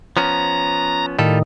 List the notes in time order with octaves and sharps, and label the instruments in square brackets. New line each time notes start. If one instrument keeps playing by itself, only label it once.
[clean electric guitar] F3 B3 C#4 [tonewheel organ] A#5
[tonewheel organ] A2 D#3 [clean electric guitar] G3 F4 A4